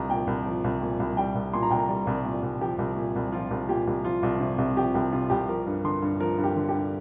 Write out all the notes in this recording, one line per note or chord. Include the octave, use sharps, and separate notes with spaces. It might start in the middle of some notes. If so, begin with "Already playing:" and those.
Already playing: C2 F3 A#5
A#2 G5
C2
F3
C2
A#2
C2
G3 G5
C2
A#2 C6
A#5
C2 G5
A#5
G3
C2
A#2
C2
F3 G4
C2
A#2
C2
F3 F4
C2
A#2 G4
C2
F3 F4
C2
C3
C2
F3 G4
C2 G4
C3 F4
C2 G4
F3 A#4
G2
D3 C6
G2
F3 A#4
G2
G4
D3
G4
G2